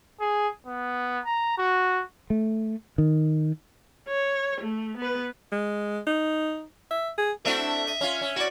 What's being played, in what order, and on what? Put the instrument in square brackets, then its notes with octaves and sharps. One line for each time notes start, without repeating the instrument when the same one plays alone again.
[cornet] G#4
B3
A#5
F#4
[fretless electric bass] A3
D#3
[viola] C#5
A3
B3 B4
[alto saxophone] G#3
D#4
E5
G#4
[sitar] A3 D4 [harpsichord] C4 E4 F#4 [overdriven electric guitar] E5
[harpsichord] D#5
[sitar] C#4 F4
C#4
[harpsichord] E4 D5 [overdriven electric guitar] F#4